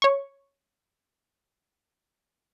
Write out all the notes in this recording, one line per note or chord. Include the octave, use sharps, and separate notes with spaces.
C#5 C#6